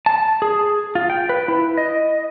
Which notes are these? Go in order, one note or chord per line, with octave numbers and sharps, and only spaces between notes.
A5
G#4
F4
G5
B4
E4
D#5